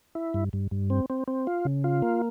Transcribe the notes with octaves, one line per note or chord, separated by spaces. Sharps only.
E4
G2
G2
G2
C4
C4
C4
F4
C#3
F4
A#3